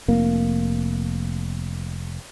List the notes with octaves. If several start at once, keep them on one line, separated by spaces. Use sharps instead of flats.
F1 A#3